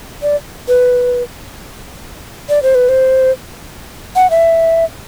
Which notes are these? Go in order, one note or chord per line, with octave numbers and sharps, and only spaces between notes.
D5
B4
D5
C5
B4
C5
F#5
E5